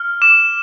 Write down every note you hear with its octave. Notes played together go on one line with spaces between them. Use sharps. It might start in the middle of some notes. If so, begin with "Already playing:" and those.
Already playing: F6
D6 E7